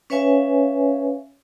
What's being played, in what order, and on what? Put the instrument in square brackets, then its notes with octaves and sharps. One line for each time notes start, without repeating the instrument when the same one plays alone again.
[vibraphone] C#4 B4 C#5 E5 F5 G#5